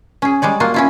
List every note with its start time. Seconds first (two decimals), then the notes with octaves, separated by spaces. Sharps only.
0.22 C#4 G#4
0.42 G3 G#3 C#5 D5
0.60 A#3 F4 F#4
0.74 C#4 E4 F4